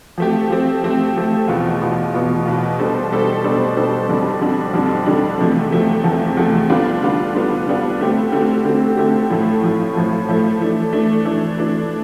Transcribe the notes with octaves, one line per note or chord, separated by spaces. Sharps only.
F3 A3 C4 G4
F3 A3 C4 G4
F3 A3 C4 G4
F3 A3 C4 G4
E2 B2 B3 F4
E2 B2 B3 F4
E2 B2 B3 F4
E2 B2 B3 F4
B2 G3 D4 A4 C5
B2 G3 D4 A4 C5
B2 G3 D4 A4 C5
B2 G3 D4 A4 C5
F2 D3 G3 D4
F2 D3 G3 D4
F2 D3 G3 D4
F2 D3 G3 D4
E2 C3 F3 A3
E2 C3 F3 A3
E2 C3 F3 A3
E2 C3 F3 A3
D3 G3 B3 D4 F4
D3 G3 B3 D4 F4
D3 G3 B3 D4 F4
D3 G3 B3 D4 F4
D3 A3 C4 G4
D3 A3 C4 G4
D3 A3 C4 G4
D3 A3 C4 G4
A2 F3 A3
A2 F3 A3
A2 F3 A3
A2 F3 A3
E3 A3 D4
E3 A3 D4
E3 A3 D4
E3 A3 D4